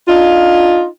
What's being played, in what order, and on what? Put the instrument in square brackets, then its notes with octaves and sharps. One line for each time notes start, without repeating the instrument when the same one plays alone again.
[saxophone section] D4 D#4 F4